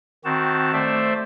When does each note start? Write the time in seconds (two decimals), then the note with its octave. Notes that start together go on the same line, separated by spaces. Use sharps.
0.25 D#3 C4 F#4 A5
0.73 A3 C5 D5 E5